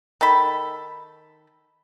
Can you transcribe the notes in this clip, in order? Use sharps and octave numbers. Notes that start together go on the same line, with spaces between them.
D#3 A4 B5